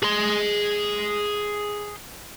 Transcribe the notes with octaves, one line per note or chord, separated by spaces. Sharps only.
G#4 C6